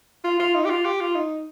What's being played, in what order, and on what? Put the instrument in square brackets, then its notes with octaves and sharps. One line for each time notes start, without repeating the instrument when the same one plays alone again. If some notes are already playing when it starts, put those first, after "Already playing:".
[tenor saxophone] F4
F4
D#4
G4
F4
G4
F4
D#4